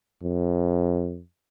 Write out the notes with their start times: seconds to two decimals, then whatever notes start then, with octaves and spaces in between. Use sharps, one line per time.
0.23 F2